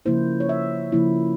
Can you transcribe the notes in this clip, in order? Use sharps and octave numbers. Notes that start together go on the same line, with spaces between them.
C#3 F3 A#3 E4 C5
C#5
E5
C#3 F3 A#3 E4